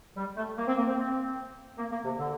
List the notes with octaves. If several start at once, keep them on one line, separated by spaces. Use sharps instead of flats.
G3
A3
A#3
C4
A#3
C4
C4
A#3
A#3
C3
D3